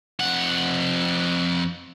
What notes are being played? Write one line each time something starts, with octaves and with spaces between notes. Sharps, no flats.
F2 F#5